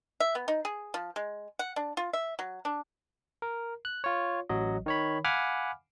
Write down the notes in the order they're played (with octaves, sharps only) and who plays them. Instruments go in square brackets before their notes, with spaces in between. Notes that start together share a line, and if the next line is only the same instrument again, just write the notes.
[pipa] E5
B3
D#4
G#4
F3
G#3
F#5
D4
F4
E5
F#3
D4
[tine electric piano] A#4
F#6
F4 C#5
A1 F#3 D#5
D#3 C#5 B5
F5 F#5 G#5 B5 D6 F6